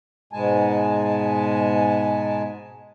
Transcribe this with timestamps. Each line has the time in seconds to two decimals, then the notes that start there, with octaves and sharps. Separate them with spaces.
0.33 G#2 B2 G#3 G#5 A5